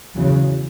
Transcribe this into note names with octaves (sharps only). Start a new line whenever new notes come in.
E2 C#3 F#3